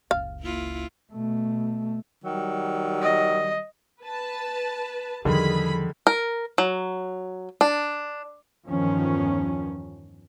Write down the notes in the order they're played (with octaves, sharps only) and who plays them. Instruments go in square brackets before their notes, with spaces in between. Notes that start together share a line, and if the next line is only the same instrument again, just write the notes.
[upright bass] F#1 C#2 [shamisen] F5
[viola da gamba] A#3 E4 F4
[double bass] B2 A3
[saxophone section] D#3 F#3 G3
[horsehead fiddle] D#5
[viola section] B4 A5
[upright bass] E2 F3 [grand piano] D3 D#3 G3 [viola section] G#4 B5
[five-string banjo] A#4
F#3
D4
[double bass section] E2 G2 D#3 F3 C#4